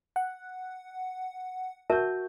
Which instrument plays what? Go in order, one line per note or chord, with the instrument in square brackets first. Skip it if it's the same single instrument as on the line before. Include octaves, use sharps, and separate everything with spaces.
[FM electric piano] F#5
[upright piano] F#4 G6 [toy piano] A#4 E5 A5